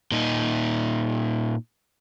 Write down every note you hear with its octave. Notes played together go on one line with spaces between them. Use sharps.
A#2 D#4